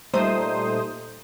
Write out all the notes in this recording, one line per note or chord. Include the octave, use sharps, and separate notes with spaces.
A#2 G3 A3 D#4 C5 D#6